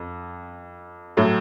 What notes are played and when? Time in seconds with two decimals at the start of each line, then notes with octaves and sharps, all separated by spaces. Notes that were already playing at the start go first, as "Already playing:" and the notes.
Already playing: F2
1.17 A2 F#3 A3